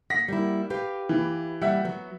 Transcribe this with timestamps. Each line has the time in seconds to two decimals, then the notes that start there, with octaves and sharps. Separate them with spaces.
0.10 F#5 A#6 B6
0.28 G3 A#3 E4
0.70 G4 B4 F5
1.09 E3
1.62 E3 G3 E5 F#5
1.84 F#3 B3